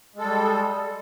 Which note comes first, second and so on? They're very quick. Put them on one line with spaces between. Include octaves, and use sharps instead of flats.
G#3 A4 G3